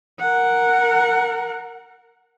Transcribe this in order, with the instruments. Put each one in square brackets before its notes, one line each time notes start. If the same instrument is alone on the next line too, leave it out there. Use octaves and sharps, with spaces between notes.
[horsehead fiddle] A#4 F#5